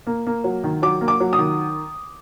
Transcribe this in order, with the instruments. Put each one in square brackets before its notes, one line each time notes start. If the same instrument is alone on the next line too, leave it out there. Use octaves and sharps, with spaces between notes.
[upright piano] A#3
A#3
F#3
D#3
F#3 D6
A#3
D6
F#3
D#6
D#3